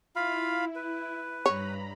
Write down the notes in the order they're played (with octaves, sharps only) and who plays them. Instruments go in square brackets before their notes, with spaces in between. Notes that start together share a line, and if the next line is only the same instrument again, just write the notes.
[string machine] E4 [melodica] F4 F5 B5
[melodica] B4
[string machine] G2 A#5 B5 [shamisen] C#5